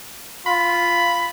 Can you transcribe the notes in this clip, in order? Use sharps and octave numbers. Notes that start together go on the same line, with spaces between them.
F4 B5